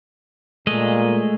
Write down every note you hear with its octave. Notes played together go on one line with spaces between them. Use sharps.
A#2 G#3 A3 D#5